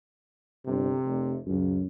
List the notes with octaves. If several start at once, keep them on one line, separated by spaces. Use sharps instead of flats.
G1 C3
F1
C#2 F#2